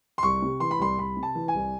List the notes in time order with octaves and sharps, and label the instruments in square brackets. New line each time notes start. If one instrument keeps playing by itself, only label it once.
[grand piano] C6
C2 C#6
C3
E3 C6
B5
C2 C6
C2 B5
C3
A5
E3
G#5
C2